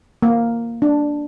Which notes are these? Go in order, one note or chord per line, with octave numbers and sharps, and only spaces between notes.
A#3
D4